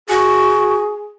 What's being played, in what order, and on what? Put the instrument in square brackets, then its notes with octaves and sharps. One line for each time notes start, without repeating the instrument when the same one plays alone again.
[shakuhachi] F#4 [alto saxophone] G#4